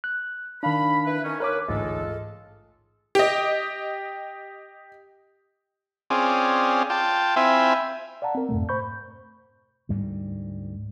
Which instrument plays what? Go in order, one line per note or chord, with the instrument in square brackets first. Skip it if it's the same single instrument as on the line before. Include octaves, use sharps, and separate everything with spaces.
[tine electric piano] F#6
[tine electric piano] D#3 D4 [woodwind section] F5 B5
[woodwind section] E4 B4
D#3 C#4
[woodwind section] D#2 B4 [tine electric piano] A#4 C#5 D6
[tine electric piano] A1 D2 G#2 [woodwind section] G#3 F4 A4
[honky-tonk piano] G4 D#5
[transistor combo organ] C4 C#4 F4 G#4 D5
F4 G5 A5
C4 E4 F4 E5 G#5
[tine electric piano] D5 F5 F#5 A5 A#5
C4 A#4
F2 G#2 B2 A3
C5 B5 C#6 G6
[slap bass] D2 G#2 G3